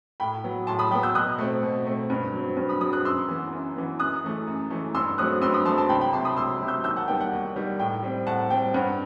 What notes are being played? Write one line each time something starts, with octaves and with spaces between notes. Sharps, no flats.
A2 G5 B5
F#3 B3
A2 A5 C6
B5 D#6
F#3 B3 G5 B5
E6 G6
B2 D#6 F#6
A3 C4
B2
A3 C4
G2
F#3 C4
G2
B5 D#6
F#3 C4 B5 D#6
D#6 F#6
F#2 C6 E6
E3 B3
F#2
E3 B3
F#2 D#6 F#6
E3 A3
F#2
E3 A3
G2 C6 E6
F#3 A3 C4 D#6 F#6
G2 C6 E6
B5 D#6
F#3 A3 C4 A5 C6
A5 C6
C2 G5 B5
G5 B5
C3 F#3 A5 C6
B5 D#6
C2 C6 E6
C3 F#3
E6 G6
D#2 E6 G6
F#5 A5
D#3 G3 B3 G5
F#5
D#2
D#3 G3 B3
A2 G5
G3 C4
A2 F#5 A5
G3 C4 G5
G2 F#5